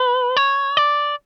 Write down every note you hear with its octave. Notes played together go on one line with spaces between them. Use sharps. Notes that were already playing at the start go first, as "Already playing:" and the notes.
Already playing: B4
C#5
D5